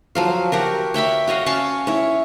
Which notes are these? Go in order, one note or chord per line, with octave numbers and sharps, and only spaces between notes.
F3 F#3 F5
F#4 G4 A#4
C#5 E5 G5 B5
F#4 C#5 D#5 F5
C#4 F5 A5 C#6
E4 C#5